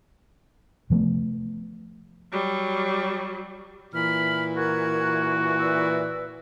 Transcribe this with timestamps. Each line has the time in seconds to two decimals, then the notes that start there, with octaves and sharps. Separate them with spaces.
0.90 C3 F3 A3 B3
2.32 F#3 G3
3.94 A#2 E3 B5 F6
4.56 F#4 A#4 F#6 G#6
5.59 B4 D5 E6